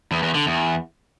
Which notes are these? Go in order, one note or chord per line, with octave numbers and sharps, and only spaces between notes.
E2
E2
D3
E2